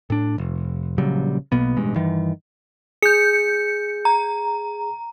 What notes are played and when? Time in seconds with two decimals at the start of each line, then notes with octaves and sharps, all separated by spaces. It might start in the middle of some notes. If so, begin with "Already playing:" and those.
0.10 A2 D4
0.38 F1
0.98 A#1 C#3 F#3 G3
1.52 B1 B2 A#3 B3
1.77 A1 G2 B2 G#3
1.96 G2 D#3 E3
3.02 G#4 G6 C#7
4.05 A#5